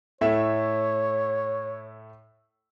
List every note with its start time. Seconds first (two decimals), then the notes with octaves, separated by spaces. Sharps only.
0.21 A2 A3 C#5 E5